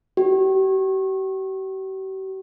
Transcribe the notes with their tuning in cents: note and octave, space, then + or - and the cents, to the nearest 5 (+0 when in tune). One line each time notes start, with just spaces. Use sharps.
G4 -45